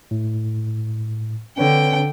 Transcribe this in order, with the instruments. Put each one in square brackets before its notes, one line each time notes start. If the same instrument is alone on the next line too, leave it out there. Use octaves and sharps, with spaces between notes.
[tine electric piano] A2
[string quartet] D3 G5 [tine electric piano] C4 B4 C#5